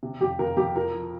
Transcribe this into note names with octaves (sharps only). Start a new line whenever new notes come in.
C3
F2 G4
F2 A#4
F2 G4
F3 A#4
F3